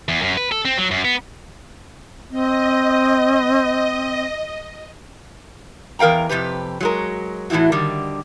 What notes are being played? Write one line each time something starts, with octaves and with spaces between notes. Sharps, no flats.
E2
F#2
B4
A4
C4
F#3
F#2
B3
C4 D#5
E2 A#4 F5 G5 A#5
F2 G#2 C3 G4 B4
F#3 G#3 A#4
A2 E3 G#3 E4 F#4
D3 D#3 G3